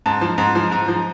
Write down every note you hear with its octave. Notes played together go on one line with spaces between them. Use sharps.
G#2 A5
F3
G#2
F3
G#2 A#5
F3